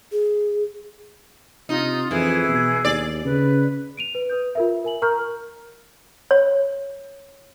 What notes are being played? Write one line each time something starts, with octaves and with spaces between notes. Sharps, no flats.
G#4
C3 D#4 F4
F2 E3 G#4
B2
D#2 D5
C#3 B4
D7 D#7 F7
B4
B4 D#6 G6
F4 A#4 E5
A#4 G#5 F#7
A#4 A#5 C#6 F6 G6
C#5